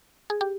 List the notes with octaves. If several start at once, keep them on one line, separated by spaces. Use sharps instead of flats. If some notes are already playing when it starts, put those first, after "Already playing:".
G#4
G4